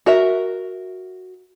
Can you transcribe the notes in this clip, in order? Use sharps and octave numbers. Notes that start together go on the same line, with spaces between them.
F#4 A#4 E5